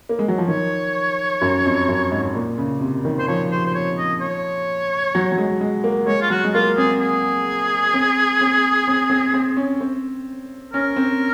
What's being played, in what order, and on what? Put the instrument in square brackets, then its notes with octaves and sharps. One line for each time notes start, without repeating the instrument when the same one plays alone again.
[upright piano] A#3
G#3
F#3
F3
[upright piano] D#3 [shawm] C#5
[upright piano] F#2
F2
F#2
G#2
A#2
C#3
C3
D#3
[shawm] C5
[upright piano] F3 [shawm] C#5
[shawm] C5
C5
C#5
D#5
C#5
[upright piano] F#3
F#3
G#3
G#3
A#3
[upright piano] G#3 [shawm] C#5
[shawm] F4
[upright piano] F#3 [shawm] F#4
[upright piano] G#3
[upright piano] A#3 [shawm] F4
[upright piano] C4 [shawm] G#4
[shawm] G#4
[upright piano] C4
C4
C4
C4
C4
C#4
C4
[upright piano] C#4 [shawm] A#4
[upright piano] C4